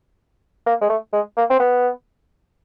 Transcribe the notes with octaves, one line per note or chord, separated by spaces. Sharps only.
A#3
G#3
A3
G#3
A#3
C4
B3